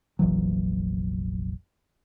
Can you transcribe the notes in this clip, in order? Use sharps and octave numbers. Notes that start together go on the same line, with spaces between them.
F1 A#1 E3 F#3